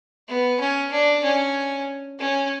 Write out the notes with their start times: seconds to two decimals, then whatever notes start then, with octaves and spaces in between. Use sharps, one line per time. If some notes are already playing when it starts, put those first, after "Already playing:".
0.28 B3
0.60 C#4
0.92 D4
1.24 C#4
2.19 C#4